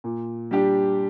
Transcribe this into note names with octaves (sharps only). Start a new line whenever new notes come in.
A#2
G3 D4 G4